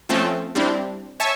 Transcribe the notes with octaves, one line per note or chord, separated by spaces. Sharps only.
F3 A3 C4 C#4
G3 C4 D4 E4
C#5 E5 G#5 A5 C#6